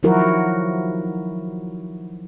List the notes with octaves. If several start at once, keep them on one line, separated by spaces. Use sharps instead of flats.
D#3 F3 F#3 E4 F#4 A#4